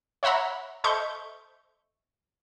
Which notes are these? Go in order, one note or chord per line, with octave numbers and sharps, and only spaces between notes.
C#5 E5 F#5 A#5 B5
A4 C5 D#5 E5 C#6 G6